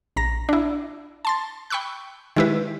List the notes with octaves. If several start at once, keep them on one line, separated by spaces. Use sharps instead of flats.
A#1 A#5 A#6
D4 E4
A5 C6 A6
G5 B5 C#6 E6 F#6
D#3 G#3 E4 G4 B4